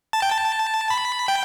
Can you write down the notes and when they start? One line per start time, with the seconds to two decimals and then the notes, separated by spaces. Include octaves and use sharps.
0.13 A5
0.22 G5
0.30 A5
0.90 B5
1.28 G5